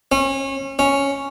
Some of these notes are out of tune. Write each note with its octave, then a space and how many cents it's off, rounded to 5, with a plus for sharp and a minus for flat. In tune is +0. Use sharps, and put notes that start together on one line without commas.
C#4 -30
C#4 +0